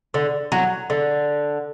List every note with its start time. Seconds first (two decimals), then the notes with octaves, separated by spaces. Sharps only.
0.14 D3
0.52 F#3
0.90 D3